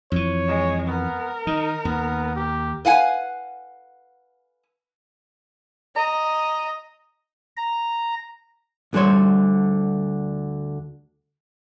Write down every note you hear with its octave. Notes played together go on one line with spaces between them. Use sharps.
F2 E3 C#5
G#3
B3 A#4
D#3 D#4
D#2 B3
G4
B4 F5 F#5 G#5
D#5 A#5
A#5
D2 D3 G3 C5 C#5